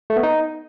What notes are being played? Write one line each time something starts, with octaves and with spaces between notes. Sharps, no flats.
A3
B3
D#4